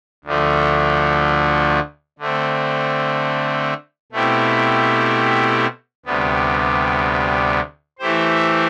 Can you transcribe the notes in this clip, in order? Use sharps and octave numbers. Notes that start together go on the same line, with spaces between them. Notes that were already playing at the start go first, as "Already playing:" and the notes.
D2 D3 F3 A3
D3 A3 C4
B2 A3 C4 E4 G4
D2 C3 G3 B3
E3 A3 E4 G4 C5